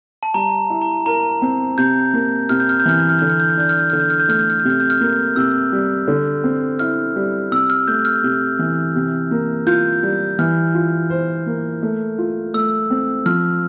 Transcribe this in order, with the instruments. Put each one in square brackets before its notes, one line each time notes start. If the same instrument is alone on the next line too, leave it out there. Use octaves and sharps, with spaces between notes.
[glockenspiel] A5
[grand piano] G3 [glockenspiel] A#5
[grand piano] E4
[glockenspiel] A#5
[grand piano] A#4 [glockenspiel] A#5
[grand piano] C4
[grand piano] C3 [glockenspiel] G6
[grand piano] A#3
[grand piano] C3 [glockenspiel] F6
[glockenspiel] G6
F6
G6
[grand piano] E3 [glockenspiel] F6
[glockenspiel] G6
F6
[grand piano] D3 [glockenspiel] G6
[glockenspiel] F6
G6
F6
[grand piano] D4 [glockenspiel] G6
[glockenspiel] F6
G6
[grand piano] D3 [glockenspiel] F6
[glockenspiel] G6
F6
G6
[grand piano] A3 [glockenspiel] F6
[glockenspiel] G6
F6
[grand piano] C3 [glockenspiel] G6
[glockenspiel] F6
G6
F6
[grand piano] A#3
[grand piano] C3 [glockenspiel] E6
[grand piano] G3
D3
C4
[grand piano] E4 [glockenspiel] F6
[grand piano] G3
[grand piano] C3 [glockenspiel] E6
[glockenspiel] F6
[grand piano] A3 [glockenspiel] G6
[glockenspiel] F6
[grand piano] C3
E3
C3
A#3
[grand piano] F4 [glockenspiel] G6
[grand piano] G3
[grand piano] E3 [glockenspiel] F6
[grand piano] F4
C5
A#3
A3
F4
[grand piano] A3 [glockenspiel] E6
[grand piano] C4
[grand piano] F3 [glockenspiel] F6